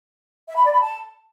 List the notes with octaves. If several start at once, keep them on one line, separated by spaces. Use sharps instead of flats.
E5
B5
D5
B5
A5